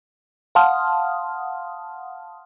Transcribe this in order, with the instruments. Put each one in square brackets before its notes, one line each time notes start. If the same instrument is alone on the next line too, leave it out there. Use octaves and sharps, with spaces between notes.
[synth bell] F5 F#5 A5 C6 D#6 F6